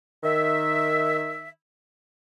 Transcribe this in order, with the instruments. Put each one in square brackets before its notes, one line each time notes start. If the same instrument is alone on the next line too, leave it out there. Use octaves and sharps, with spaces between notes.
[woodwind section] D#3 E5